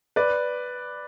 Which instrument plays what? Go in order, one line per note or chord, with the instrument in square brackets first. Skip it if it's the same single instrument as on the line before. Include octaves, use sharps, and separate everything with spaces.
[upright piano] B4 D5